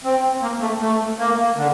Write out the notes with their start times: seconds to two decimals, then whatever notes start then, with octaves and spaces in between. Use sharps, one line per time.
0.04 C4
0.42 A#3
0.61 A3
0.80 A3
1.18 A#3
1.56 D3